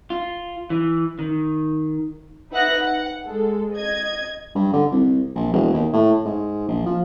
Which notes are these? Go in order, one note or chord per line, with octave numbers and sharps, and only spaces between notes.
F4
E3
D#3
D#4 B4 E5 F#5 F#6 A#6
F#5
G#3 A4
D#5 G#6
G2
D3
C2
A#1
E1
D#2
A2
G#2
A#1
F3